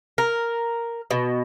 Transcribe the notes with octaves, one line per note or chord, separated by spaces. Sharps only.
A#4
B2